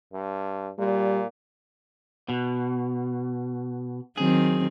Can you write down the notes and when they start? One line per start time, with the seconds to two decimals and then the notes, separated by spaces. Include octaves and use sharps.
0.13 G2
0.78 A#2 G3
2.29 B2
4.17 D#3 F#3 C4 G#4